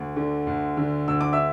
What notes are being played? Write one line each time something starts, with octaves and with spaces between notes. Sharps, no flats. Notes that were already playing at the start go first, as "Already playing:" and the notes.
Already playing: D2
D3
D2
D3
D2 E6
D6
E5 E6